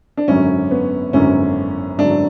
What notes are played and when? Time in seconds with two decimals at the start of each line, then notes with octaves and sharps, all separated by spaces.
0.17 D4
0.28 G#1 F#2 D3 F#3 C#4
0.71 B3
1.13 G#1 F#2 D3 F#3 C#4
1.98 G#1 F#2 D3 F#3 D4